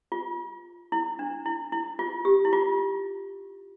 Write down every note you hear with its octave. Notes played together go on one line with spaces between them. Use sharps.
F4
E4
D4
E4
E4
F4
G4
E4
F4